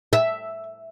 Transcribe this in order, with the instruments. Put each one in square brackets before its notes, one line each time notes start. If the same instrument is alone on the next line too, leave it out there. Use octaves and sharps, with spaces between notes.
[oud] E5